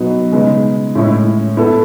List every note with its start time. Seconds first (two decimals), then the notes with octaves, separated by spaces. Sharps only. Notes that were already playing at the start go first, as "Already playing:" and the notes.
Already playing: B2 F#3 B3 D#4
0.32 C#3 G#3 B3 D#4
0.95 A2 G#3 C#4 E4
1.57 B3 E4 A4